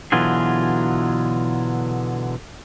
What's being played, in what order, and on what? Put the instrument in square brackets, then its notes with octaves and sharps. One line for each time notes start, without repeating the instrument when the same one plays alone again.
[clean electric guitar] B2 D3 E3 F#3 F4 G#4